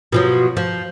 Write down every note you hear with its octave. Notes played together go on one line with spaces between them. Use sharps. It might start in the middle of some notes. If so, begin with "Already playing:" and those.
B2 F3 F#3
F3